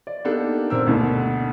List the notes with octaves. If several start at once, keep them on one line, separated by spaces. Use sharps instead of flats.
D5
A#3 B3 D4 D#4 G4 A4
A#2 C4 A#4 C5 E6
D2 B2 D3